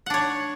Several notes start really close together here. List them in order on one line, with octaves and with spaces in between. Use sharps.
F#5 D4 C#5